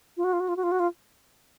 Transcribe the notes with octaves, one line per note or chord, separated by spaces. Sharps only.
F4
F#4
F4
F#4
F4
F#4
F4
F#4
F4